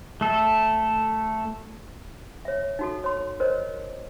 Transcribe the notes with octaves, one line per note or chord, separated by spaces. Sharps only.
A3 A4
C#5 E5
D#4 F#4 A4
C#5 C6
A#4 C5 C#5 D#5